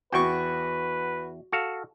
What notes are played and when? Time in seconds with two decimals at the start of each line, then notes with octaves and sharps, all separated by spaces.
0.12 E2 F#4 B4 G5 C#6
1.52 F#4 A4 F5